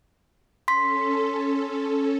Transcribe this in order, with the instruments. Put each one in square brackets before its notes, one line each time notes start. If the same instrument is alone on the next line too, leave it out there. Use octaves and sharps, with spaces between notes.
[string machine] C#4 A4 [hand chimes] C6 B6